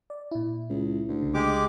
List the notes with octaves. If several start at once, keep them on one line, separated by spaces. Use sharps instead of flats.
D5
A#2 E4
C#2
D2
C2 C#3
G#3 G4 D6